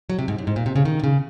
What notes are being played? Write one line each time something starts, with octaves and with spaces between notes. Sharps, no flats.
F#3
C3
G#2
F#2
G#2
A#2
C3
C#3
D#3
C3
C#3